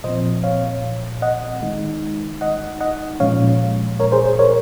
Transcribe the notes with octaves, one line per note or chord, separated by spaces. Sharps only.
A#2 F3 C4 C5 D#5
C#5 F5
D#5 F#5
D#3 G#3 D#4
D#5 F#5
D#5 F#5
A#2 F3 G#3 C#4 C#5 F5
A#4 C#5
G#4 C5
G#4 C5
A#4 C#5